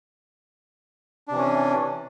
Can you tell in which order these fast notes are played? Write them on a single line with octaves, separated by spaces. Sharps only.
D4 C3 E3 C#4